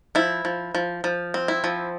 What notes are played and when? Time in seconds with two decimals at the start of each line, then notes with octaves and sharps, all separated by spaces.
0.15 F3 E4
0.45 F3
0.75 F3
1.04 F3
1.34 C4
1.48 E4
1.64 F3